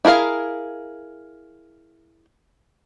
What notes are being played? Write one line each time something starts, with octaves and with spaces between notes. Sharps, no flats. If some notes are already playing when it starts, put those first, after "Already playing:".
E4 G#4 A#4 F5